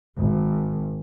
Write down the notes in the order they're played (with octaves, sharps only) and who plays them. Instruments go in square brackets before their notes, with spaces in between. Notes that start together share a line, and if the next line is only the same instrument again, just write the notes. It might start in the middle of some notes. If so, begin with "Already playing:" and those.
[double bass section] G#1